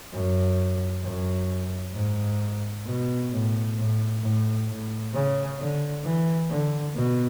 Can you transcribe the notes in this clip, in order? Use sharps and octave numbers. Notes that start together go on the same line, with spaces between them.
F#2
F#2
G#2
B2
A2
A2
A2
A2
C#3
D3
E3
D3
B2